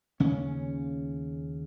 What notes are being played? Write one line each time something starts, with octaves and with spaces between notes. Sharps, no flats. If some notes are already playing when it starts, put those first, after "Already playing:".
D#2 C#3 C#4